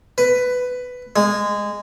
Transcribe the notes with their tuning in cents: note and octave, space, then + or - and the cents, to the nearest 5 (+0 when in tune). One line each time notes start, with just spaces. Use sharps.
B4 +10
G#3 -15